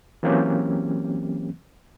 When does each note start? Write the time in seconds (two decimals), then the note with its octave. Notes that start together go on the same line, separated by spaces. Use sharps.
0.23 E3 F#3 A#3 C4 C#4 G4